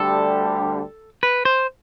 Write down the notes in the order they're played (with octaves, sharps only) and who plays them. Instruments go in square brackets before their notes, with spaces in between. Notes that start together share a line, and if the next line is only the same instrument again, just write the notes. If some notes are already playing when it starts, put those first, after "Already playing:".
Already playing: [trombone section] D2 D3 G3 D4 G4 [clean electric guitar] A4
[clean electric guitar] B4
C5